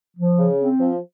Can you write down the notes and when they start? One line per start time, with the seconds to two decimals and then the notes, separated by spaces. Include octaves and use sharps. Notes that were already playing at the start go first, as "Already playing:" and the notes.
0.17 F3
0.38 C#3
0.59 C4
0.80 F3